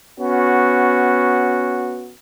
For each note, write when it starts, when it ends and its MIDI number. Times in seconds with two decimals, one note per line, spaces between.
0.20 2.12 59
0.20 2.12 61
0.20 2.12 66